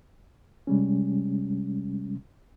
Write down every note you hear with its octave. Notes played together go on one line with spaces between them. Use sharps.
C3 G3 G#3 C#4